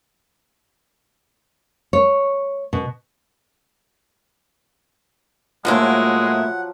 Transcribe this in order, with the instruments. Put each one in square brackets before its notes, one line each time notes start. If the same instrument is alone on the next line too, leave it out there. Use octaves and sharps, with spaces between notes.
[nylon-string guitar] C#5
B2
[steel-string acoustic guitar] A2 A#3 E4 [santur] F3 F#3 [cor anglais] G#3 [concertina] F#5